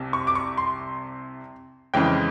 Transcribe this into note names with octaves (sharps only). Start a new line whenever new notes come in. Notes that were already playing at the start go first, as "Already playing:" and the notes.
Already playing: C2 C3
C#6
D6
C#6
C6
F2 C#3 E3 G#3 G5